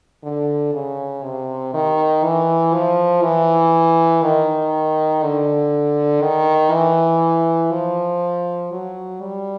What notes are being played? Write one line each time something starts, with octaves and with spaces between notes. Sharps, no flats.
D3
C#3
C3
D#3
E3
F3
E3
D#3
D3
D#3
E3
F3
F#3
G3